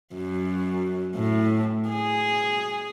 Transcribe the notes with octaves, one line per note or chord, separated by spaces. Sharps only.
F#2
A2
G#4